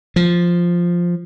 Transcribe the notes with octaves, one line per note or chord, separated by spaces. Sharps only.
F3